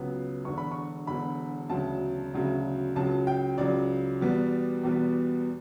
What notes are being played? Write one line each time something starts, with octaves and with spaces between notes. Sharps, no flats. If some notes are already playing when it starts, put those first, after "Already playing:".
Already playing: C#2 C#3 F#3 B3
E1 E2 D3 C#6
B5
C#6
E1 E2 D3 B5
E1 D2 C#3 F#3 A5
E1 D2 C#3 F#3
C#2 C#3 F#3 A5
G5
C#2 C#3 F#3 D5
E2 B2 G3 B3
E2 B2 G3 B3